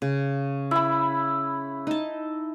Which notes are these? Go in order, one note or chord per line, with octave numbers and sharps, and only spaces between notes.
C#3
E4 B5
D#4 A5